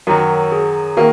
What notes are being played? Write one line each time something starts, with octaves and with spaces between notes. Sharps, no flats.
F#2 D#3 F#3 F#4 A#4
G#4
D#3 A#3 F#4 A#4